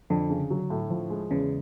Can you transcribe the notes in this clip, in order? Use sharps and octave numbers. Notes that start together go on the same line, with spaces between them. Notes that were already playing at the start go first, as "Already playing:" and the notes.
F2 D3
C#3
F#3
A2
F3
G#3
E2 C#3